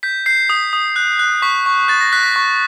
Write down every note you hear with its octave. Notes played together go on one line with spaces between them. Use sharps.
G6 B6
G6 C7
D#6
D#6
F#6
F#6
C#6 B6
C#6
F#6 A6
A#6
F#6 B6
B6
C#6